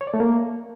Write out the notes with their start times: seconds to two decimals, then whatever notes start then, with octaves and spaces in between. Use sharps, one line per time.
0.01 C#5
0.07 D5
0.14 A3
0.20 A#3